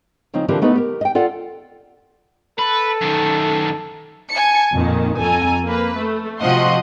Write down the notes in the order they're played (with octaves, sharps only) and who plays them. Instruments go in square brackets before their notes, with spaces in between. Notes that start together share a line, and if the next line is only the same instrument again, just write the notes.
[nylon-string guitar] C#3 F3 C4 D#4
D3 E3 F3 A#3 C4 G4
A3 B3 D#4 A4 B4
G4 A#4
D#5 G5
F4 A4 D5 F#5
[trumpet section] A4 [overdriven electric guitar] B4
[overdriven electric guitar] F#2 D#3
[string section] G#5 A5 C#7
F2 A#2 D#3
F2 A4 G#5 A#5
A#3 B4
A3
C3 F3 F#4 D#5 F#5 C6